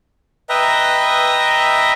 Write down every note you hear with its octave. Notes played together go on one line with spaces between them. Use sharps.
B4 D#5 E5 G5 A#5